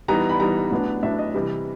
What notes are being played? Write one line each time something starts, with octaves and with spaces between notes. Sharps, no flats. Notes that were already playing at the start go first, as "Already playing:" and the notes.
E3 G3 B3 D#4 A#5
B5
E3 G3 B3 D#4 A#5
A2 F#3 B3 D4
A2 F#3 B3 D4 E5
D#5
C3 E3 G3